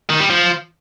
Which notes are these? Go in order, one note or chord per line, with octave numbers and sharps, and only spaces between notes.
D#3
G3
F3